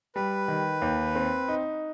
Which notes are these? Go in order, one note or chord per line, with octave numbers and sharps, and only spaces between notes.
G3 B4
D#3
D#2
C4
D#4